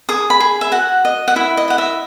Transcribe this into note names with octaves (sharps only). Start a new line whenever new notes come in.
G#4 D#6
B5
G#4
E5
F#4 F#5
D#5
F#5
E4 E5
D#5
D#5 F#5
E5